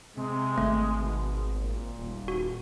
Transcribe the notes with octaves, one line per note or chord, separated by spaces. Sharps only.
C3 G#3
G#1 A3
B2
A#2
D#1
F#4